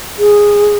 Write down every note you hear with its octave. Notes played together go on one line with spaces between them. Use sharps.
G#4